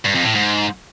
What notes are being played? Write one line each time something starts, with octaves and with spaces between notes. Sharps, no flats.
G2
F2
A2
G#2